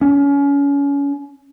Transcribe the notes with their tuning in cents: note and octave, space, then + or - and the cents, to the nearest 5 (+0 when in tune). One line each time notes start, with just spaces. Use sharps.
C#4 +30